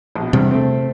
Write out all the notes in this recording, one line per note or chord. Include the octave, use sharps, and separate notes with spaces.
A#1 B2
E2 G2 C3
A3 C4